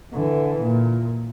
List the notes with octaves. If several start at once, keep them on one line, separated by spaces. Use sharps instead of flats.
D3 E3
A#2